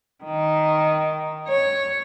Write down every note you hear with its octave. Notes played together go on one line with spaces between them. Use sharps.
D#3
C#5